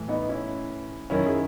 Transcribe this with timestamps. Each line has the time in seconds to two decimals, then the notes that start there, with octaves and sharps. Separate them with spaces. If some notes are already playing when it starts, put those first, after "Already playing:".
Already playing: A2 E3
0.08 B3 D#4
0.29 C#4 E4
1.10 F#2 D#3 C#4 E4
1.26 E4 G#4